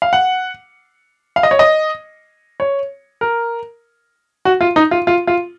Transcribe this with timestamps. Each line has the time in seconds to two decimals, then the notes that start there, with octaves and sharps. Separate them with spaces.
0.02 F5
0.13 F#5
1.36 F5
1.43 D#5
1.51 C#5
1.59 D#5
2.60 C#5
3.21 A#4
4.45 F#4
4.61 F4
4.76 D#4
4.91 F4
5.07 F4
5.27 F4